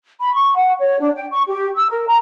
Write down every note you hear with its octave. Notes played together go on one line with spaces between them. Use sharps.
B5
C#6
F#5
C#5
D4
G5
C#6
G4
E6
A#4
A#5